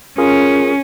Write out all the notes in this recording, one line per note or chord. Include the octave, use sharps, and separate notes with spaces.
C#4 F4 G#4 A#4